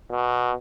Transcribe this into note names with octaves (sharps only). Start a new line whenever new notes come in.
B2